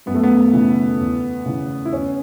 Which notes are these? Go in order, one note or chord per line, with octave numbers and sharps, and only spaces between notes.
F#2 B3
A3
B3
C#3 E3
E2
C#3 E3
E4
E2 C#4